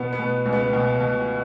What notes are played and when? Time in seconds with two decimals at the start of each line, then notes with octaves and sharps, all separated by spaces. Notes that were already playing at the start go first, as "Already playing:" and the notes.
Already playing: B2 B3
0.12 B3
0.19 B2
0.46 C#2
0.52 B3
0.73 B2
1.00 B2